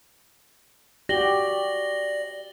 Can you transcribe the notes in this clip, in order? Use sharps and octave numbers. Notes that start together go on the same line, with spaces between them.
F#4 G4 D5 A#6 F#7 G7